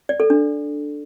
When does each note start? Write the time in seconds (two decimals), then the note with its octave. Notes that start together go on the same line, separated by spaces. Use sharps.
0.09 D5
0.20 A4
0.30 D4